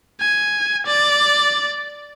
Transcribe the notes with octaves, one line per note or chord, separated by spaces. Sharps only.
G#5
D5